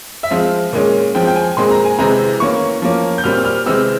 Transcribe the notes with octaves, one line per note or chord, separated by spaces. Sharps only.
E5
F3 G#3 C4 F5
A#2 G#3 C#4
F3 G#3 C4 G5
G5
G#5
A#2 G#3 C4 C6
A#5
G#5
C3 E3 G#3 C4 A#5
E3 A#3 C#4 C#6
F3 A#3 C#4
G6
A#2 G3 C4 F6
F6
C3 E3 G#3 C4 E6